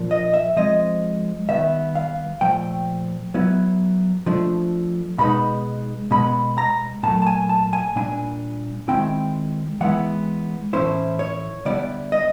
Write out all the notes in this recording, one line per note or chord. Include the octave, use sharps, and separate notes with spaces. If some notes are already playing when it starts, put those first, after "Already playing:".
Already playing: A#2 F3 A#3 D4
D#5
E5
F3 G#3 C4 D#5
D#3 G3 B3 E5
F5
A#2 F3 A3 G5
F#3 B3 E4
F3 A3 D4
B2 G#3 B3 D#4 B5
B2 G#3 B3 B5
A#5
A#2 F#3 A3 A5
A5
G#5
A5
G#5
A#2 G3 A#3 D4 G#5
D#3 G#3 C4 E4 G5
E3 G#3 B3 E4 F#5
A2 E3 A3 C#4 E4 C5
C#5
D3 G3 B3 E4 D5
D#5